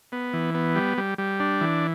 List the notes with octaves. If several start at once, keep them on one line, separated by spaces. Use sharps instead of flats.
B3
E3
B3
G3
G3
G3
D4
E3